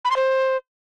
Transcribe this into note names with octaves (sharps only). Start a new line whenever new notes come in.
B5
C6
C5